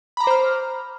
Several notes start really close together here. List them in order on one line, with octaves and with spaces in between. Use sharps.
B5 A#5 D6 C5 F6